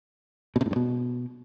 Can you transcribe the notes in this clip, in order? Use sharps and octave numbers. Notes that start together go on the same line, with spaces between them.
B2
C3
A2
G2
B2